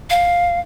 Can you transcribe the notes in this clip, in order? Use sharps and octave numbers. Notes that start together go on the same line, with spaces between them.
F5